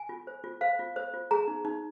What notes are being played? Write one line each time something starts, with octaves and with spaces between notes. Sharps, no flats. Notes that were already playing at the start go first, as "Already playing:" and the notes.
Already playing: G#5
F4
C5
F4
C5 F5
F4
C5
F4
G#4 A#5
D#4
D#4